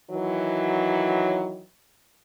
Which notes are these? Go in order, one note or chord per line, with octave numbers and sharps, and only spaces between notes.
D#3 E3 F#3